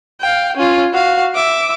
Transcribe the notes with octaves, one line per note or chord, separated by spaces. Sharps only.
F5 G5
C#4 F4
F#4 F5
E5 D6